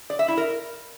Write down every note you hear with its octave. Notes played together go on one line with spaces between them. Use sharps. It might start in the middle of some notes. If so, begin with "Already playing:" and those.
D5
E5
E4
A#4